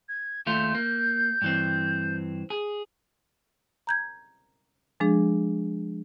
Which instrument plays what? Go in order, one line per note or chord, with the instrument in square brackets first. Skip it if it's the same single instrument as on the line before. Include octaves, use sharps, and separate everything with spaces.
[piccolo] G#6
[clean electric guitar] D#2 A3 F4 [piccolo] G6
[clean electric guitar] A#3
G2 E3 C4
G#4
[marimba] A#5 G6 G#6
F3 G#3 D4 G#4